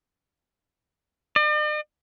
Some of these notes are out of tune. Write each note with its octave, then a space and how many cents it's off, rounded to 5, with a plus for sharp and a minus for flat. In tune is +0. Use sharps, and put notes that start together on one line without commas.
D5 +45